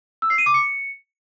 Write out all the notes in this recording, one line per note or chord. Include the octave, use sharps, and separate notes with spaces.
E6
C7
D#7
D6
C#7